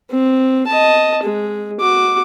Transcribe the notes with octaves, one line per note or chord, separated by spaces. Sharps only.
C4
D#5 A5
G#3
F#4 D6